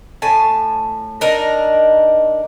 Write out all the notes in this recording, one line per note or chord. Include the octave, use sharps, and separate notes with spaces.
A2 G#5 A5
D4 D#4 A#4